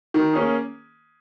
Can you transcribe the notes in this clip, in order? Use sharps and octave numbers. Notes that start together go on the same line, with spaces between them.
D#3
A#3 C#4 G#4